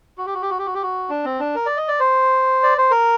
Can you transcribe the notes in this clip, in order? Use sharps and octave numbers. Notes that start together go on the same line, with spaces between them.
F#4
G4
F#4
G4
F#4
G4
F#4
G4
F#4
D4
C4
D4
A#4
D5
D#5
D5
C5
D5
C5
A#4